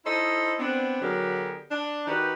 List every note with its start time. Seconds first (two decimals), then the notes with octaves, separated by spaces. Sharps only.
0.05 D#4 E4 A4 C5 D#5
0.59 B3 C4 D4
1.02 D3 F#3 B3 G4 G#4 A#4
1.71 D4 D5
2.07 D#3 D#4 F#4 G4 B4